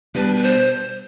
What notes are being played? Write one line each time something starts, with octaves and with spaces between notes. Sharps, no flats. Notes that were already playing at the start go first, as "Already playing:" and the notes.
B2 G3 D4 B4
B4
C5